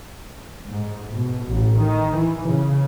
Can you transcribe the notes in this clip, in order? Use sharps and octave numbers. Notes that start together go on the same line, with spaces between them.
G#2
B2
A1
D#3
E3
C#3